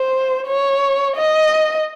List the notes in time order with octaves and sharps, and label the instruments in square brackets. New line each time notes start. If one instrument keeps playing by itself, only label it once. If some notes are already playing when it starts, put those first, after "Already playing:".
Already playing: [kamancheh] C5
C#5
D#5